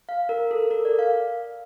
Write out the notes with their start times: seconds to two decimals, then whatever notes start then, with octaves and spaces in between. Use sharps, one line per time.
0.09 F5
0.29 A#4
0.51 A4
0.71 A#4
0.85 D5
0.99 F5